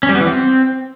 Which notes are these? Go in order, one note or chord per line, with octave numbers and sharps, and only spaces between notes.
C#4
G3
B3
E3
C4